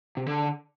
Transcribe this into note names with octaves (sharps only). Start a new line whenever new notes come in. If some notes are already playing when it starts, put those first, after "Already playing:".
C3
D3